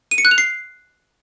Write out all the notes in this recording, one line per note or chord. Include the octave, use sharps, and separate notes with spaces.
D#7
C#7
F#6
F7
C7